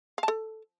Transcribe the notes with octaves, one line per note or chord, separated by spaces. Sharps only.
F5
A5
A4